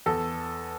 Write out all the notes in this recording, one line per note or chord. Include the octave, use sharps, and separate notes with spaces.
E2 A4